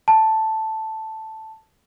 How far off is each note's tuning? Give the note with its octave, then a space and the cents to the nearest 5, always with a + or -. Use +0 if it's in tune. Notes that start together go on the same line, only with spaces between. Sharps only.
A5 +0